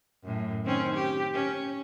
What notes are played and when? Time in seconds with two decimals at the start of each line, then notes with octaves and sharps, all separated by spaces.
0.24 F#2 A2
0.64 D#3 C4 C#4
0.95 G4
1.34 C#4